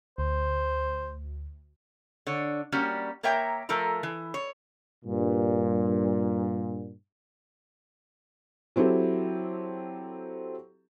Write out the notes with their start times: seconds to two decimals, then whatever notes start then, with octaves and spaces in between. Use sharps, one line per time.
0.18 D2 C5
2.27 D3 C#5
2.72 G3 A#3 C#4 F#4
3.23 A#3 A#4 C#5 E5 G5 A#5
3.69 F3 A3 A4 A#4 A#5
4.03 E3
4.34 C#5
5.05 G2 A#2
8.76 F#3 C4 E4 G4 A4